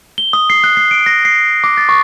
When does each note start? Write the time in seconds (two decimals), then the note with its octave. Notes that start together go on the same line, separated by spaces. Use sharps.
0.18 G7
0.33 D#6
0.50 C7
0.64 F#6
0.77 C7
0.91 D7
1.06 A#6
1.25 C7
1.64 D6
1.77 A6
1.89 C#6